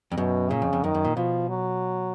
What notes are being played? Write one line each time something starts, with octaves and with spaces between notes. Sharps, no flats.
F2
F#2 B2
A#2 C#3
F2
F2
F#2 D#3
F#2
A#2
B2 F3
F#3